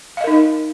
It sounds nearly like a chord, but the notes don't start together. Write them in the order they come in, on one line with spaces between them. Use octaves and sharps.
F5 D#5 A#4 D#4